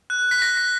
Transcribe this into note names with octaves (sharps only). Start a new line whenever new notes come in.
F#6
B6
A#6
B6